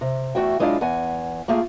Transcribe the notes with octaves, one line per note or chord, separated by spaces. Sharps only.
C3
E2 A3 F#4 E5 G5
F#3 G#3 D4 E4 F4 F5
E2 F#5 G#5
A3 A#3 F4 G#4